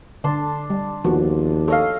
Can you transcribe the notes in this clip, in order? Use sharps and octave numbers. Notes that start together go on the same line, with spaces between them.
D3 D4 A5 C6
G3
D#2 F3 B3 F#4
A4 C#5 D#5 F5